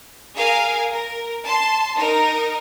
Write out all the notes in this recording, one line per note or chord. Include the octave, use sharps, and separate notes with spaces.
G#4 A#4 F5 G#5
A#4
A5 C6
D#4 A#4